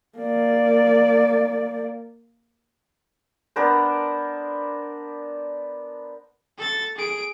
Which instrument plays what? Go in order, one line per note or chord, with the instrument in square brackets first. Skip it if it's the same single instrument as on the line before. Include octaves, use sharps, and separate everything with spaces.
[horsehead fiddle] A#3 D5
[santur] B3 D4 A#4 C5
[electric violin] A4 A6
G#4 D7